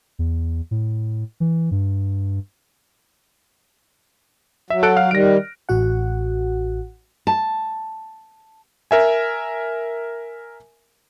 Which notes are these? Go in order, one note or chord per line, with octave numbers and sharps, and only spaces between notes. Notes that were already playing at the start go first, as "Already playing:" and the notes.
E2
A2
E3
G2
F#3 E5
A4 F#6 D7
F5 F6
D#3 G3 A#6 D7
A1 F#4 F#5
A5
A#4 E5 G#5